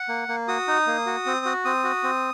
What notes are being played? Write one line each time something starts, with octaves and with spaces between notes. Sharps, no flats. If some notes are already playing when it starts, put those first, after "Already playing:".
Already playing: F#5
A#3
A#3
F#4 D#6
D#4
A#3
F#4
C4
F#4
C4 D#6
F#4
C4